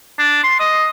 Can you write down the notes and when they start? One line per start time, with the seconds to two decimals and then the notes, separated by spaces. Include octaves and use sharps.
0.19 D4
0.43 C6
0.60 D#5